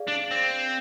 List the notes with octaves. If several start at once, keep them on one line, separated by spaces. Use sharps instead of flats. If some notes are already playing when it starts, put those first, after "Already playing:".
Already playing: G#4 D5 F5
D4
C4